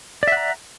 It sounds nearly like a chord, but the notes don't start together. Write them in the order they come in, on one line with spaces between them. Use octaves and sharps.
D5 E5 F#5 A#5